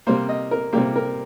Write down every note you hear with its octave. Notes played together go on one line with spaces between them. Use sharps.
C3 G3 A#3 C5
D#5
A#4
C3 G3 A#3 G4
A#4